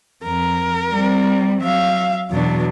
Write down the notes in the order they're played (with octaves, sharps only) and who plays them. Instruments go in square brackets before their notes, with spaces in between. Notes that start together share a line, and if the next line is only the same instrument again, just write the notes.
[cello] F2 [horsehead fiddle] A#4
[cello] G3 C4
[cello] F#3 [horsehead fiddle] E5 F5
[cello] E2 B2 [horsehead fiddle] F#3 D4